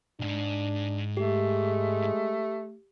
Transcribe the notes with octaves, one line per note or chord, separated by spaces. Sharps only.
B1 G#2 D4
G#3 A3 G4